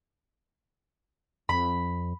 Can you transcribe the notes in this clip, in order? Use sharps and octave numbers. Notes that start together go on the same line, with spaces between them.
F2 B5